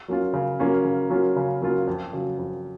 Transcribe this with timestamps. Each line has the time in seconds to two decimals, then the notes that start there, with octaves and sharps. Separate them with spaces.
0.08 F#3 A#3 C#4 F4
0.34 C#3
0.59 F#3 A#3 C#4 F4
0.84 C#3
1.10 F#3 A#3 C#4 F4
1.36 C#3
1.62 F#3 A#3 C#4 F4
1.87 F2
2.13 C#3 F#3
2.38 F2